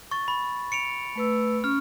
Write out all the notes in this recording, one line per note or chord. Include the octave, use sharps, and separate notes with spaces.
C#6 A6
B5
C#7 D7 F7
A3 B4 E6
C#4 C#6 F6